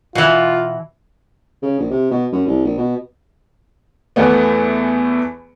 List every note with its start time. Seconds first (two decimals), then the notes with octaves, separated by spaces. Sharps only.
0.15 B2 E3 F4
1.62 C#3
1.79 A#1
1.91 C3
2.11 B2
2.32 F#2
2.47 C2
2.65 A#1
2.77 B2
4.16 E2 E3 A3 B3